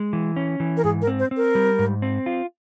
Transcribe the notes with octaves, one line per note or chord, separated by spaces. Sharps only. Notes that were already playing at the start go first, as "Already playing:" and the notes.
Already playing: G#3
E3
C#4
E3
A#4
G#2 G#4
A#4
C4
C5
C4
A#4
G3
G#2
C4
F4